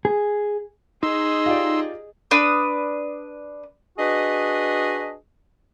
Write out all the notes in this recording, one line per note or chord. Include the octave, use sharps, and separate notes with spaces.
G#4
D#4 G#4 D#5 C6 E6
F4 G4 D5
D4 B4 D#6
D4 F#4 G#4 B4 D#5